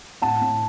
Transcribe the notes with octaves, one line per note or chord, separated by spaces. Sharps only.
A2 F#5 A5
A2